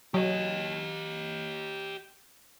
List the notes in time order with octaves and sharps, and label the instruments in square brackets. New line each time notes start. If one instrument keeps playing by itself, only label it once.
[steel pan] F#3 [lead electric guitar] G4 D#5